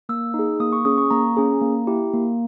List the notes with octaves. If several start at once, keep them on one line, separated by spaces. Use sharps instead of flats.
A#3 E6
D#4
G#4
A#3 D#6
C#6
C#4 G#4 D#6
C#6
A#3 A#5
C#4 G#4
A#3
E4 G4
A#3